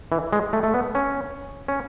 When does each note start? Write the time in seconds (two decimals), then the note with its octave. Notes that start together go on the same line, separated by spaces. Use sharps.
0.12 E3
0.33 G#3
0.53 A3
0.63 A3
0.74 B3
0.95 C#4
1.68 C#4